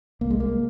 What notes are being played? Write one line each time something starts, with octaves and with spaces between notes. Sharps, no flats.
C2 A#3
G#3
A#3